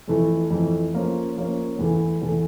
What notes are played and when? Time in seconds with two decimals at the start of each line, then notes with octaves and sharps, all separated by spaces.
0.08 F2 E3 A3
0.50 F2 E3 A3
0.94 F3 A#3 C#4
1.37 F3 A#3 C#4
1.79 E2 E3 A3
2.22 E2 E3 A3